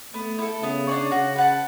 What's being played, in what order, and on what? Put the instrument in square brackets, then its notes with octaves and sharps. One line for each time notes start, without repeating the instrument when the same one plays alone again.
[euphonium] A3 [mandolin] B3
[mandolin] E4 A4
[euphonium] C#3 [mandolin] B3
[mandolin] D4 G#4 C#5
[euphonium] C#3 [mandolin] F#4
[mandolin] B4 F#5 A5